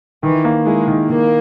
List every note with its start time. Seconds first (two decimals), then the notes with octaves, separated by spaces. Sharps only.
0.23 D#3 E3
0.45 A#3
0.66 G#3 E4
0.88 D#3
1.09 D#3 A#3